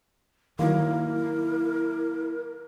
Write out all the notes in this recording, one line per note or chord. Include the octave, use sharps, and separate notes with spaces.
D#3 F#3 A#3 E4 A#4